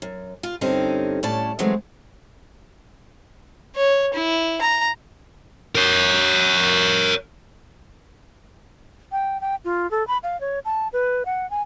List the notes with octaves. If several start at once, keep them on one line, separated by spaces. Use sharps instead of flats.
F#2
F4
G2 D3 C4 C#4 D#4 G4
A2 C#4 D5 A5
E3 F#3 G#3 A3 C4
C#5
E4
A#5
A#4 C#5
G5
G5
F4
A4
B5
F5
C#5
A5
B4
F#5
G#5